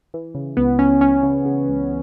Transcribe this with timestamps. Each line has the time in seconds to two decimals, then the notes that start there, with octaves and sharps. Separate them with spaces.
0.14 E3
0.35 C#3
0.57 C#2 B3
0.79 C#2 C#4
1.01 C#2 C#4
1.23 C#3
1.45 C#3
1.68 C#2